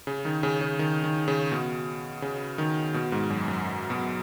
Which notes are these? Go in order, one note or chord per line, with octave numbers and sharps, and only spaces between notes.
C#3
D#3
C#3
C#3
D#3
D#3
C#3
B2
C#3
D#3
B2
G#2
F#2
F#2
B2